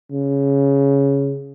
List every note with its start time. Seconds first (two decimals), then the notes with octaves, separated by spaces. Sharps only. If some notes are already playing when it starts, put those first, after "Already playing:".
0.12 C#3